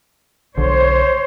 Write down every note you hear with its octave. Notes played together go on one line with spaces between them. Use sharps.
B1 D3 C5 C#5